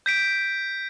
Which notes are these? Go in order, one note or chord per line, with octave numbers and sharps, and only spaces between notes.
G6 B6 D7